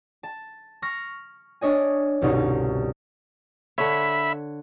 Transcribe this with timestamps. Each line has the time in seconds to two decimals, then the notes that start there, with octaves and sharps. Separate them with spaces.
0.23 A5
0.82 C#6 F6 A#6
1.61 D4 C#5 D#5 G#5
2.21 G1 C2 B2 C#4 D#4
2.34 D#4
3.78 D3 C#5 E5 B5